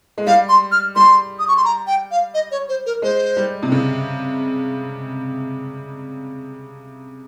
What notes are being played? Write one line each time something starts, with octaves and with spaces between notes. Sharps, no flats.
G#3
G3 F5
C6
F6
G3 C6
D#6
C#6
C6
A#5
G5
F5
D#5
C#5
C5
A#4
G#3 C5
G3
C3
C#3